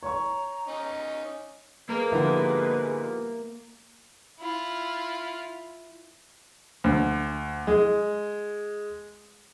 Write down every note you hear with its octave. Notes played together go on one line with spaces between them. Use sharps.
C#5 A#5 C#6
C#4 D#4
G#3 A#3 A#4 B4
G#2 D3 F3 G3 B3 E4
E4 F4
D2
G#3